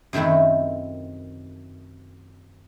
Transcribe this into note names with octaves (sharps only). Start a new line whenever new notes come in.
F#2 C3 D#3 A3 E4